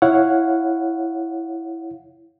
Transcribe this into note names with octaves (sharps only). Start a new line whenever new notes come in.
E4 C#5 F5 F#5